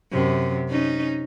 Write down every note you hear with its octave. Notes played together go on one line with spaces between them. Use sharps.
F#2 C3
C#4 D#4